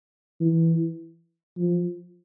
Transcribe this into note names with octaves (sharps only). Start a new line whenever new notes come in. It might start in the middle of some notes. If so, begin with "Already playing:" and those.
E3
F3